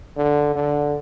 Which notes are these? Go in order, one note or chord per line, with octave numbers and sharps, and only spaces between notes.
D3
D3